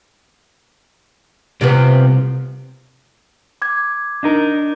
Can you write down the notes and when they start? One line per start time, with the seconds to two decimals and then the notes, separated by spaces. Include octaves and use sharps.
1.61 C2 C3 F3 B3
3.62 D6 G#6
4.23 D4 D#4 A#4